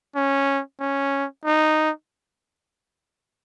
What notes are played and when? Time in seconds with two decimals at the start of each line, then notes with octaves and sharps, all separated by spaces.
0.16 C#4
0.80 C#4
1.45 D#4